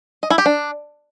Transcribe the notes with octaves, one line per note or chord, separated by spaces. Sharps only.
D#5
E4
G4
D4